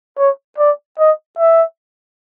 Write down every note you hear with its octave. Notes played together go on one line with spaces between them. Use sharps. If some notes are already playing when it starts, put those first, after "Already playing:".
C#5
D5
D#5
E5